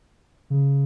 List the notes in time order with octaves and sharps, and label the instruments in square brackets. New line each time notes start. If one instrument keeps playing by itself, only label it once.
[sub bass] C#3